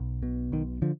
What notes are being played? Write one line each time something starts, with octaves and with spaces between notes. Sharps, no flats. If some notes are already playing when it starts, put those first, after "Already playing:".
Already playing: B1
B2
B1 D#3
D3 F3